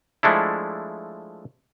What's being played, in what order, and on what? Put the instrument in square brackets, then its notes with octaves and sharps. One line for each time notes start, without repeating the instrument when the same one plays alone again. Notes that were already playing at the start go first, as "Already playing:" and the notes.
[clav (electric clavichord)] F3 G#3 A3 D4 E4